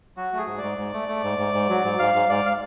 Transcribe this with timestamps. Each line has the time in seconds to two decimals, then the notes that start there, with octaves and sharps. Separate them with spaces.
0.17 F#3 F#4
0.32 A3
0.38 G#4
0.47 G#2
0.58 D5
0.63 G#2
0.78 G#2
0.93 A3
1.08 A3
1.23 G#2
1.38 G#2
1.54 G#2
1.69 F#3
1.84 G#2
1.99 G#2 F5
2.14 G#2
2.29 G#2 D5
2.46 F5